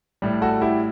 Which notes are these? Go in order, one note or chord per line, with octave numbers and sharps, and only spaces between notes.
A2 G3
F#4 A4
E4 G4